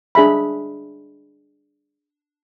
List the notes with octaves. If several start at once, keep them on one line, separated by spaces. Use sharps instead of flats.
D4 G#4 E5 B5